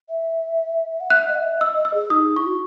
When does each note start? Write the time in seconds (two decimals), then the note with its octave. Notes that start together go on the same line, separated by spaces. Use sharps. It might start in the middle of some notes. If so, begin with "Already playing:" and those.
0.09 E5
1.00 F#5
1.10 E5 F#6
1.28 D#5
1.35 F#5
1.39 E5
1.60 D#5 E6
1.77 D#5
1.85 E6
1.94 G#4
2.10 D#4 D#6
2.36 E4 C#6
2.46 F#4